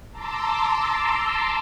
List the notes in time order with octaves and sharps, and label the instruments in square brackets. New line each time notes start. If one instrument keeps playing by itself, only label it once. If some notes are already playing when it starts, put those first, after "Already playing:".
[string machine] A5 A#5 C6 D6 E6